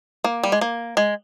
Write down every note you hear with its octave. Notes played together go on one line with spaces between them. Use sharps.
A#3
G3
G#3
A#3
G#3